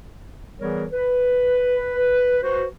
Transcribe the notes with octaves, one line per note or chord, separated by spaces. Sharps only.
E3 G3 B3 G#4 A#4 C#5
B4
F#4 B4 C5